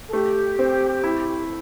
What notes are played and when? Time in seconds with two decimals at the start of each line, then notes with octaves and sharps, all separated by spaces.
0.07 A4
0.13 A3 G4
0.59 C4
1.04 E4